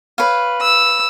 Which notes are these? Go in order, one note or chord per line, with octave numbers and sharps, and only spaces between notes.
B4 C#5 F5
E6